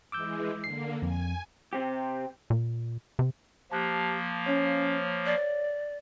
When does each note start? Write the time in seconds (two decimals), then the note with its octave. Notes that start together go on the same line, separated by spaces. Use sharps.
0.12 E3 G#3 D6 E6 G6
0.64 D3 A#3 C7
1.02 F2 G#5
1.73 C3 C4 G4
2.50 A#2
3.19 C3
3.72 F3 A#3 G4 A5 F#6
4.46 C#4 C#5 F5
5.26 D5